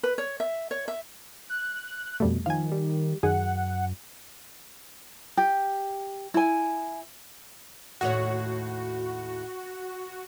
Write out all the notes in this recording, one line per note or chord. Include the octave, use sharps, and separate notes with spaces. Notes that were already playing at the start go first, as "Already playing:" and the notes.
B4
C#5
E5
C#5
E5
F#6
F2 B2 G3 A3
D#3 F3 F5 G#5
G3
F#2 D#3 G#4 F#5
G4
E4 G#5
D#2 A2 F#4 C#5